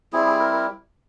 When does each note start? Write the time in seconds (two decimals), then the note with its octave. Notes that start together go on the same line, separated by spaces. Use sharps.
0.13 G3 C4 E4 G#4
0.26 G#4
0.40 A#4
0.53 A#4